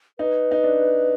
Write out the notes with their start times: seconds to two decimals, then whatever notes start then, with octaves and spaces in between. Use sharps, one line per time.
0.19 D#4 B4
0.51 D#4
0.64 D4